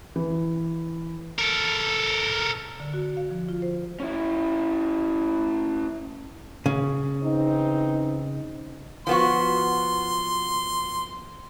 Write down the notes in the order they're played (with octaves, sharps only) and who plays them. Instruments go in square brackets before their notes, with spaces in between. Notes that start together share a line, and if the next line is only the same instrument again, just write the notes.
[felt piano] E3
[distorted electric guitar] A4 A#4
[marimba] D3
F#4
F5
F3
F4
C5
[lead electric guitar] C#4 E4
[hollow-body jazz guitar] C#3
[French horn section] E3 C4 D#4
[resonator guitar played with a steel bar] F3 B3 F#4 [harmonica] C6